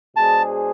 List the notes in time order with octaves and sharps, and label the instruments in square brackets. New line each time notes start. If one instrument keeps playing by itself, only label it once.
[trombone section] B2 G#3 D4 G#4 C5 [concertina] A5